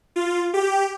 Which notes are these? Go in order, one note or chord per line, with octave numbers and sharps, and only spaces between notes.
F4
G4